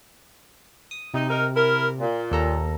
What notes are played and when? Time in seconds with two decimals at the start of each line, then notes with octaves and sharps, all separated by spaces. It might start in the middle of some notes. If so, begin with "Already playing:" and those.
0.91 D#6
1.14 C3 D#4
1.29 D#4 A#4
1.54 E4 A#4
1.99 A#2
2.31 D#2 A4 A#5